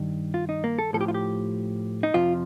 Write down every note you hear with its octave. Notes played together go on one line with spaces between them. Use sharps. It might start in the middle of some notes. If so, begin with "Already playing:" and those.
Already playing: G2 D#3
F4
D#4
A#3
A4
A2 F3 A4
G4
F4
G4
D#4
F2 C3 F3 F4